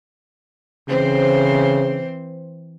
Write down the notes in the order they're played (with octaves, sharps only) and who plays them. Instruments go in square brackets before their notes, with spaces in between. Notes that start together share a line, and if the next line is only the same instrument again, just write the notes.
[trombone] C#3 [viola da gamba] E3 C4 C5